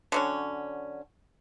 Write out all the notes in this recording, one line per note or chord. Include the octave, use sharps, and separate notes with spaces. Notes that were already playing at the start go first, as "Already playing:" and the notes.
D3 F#3 C#4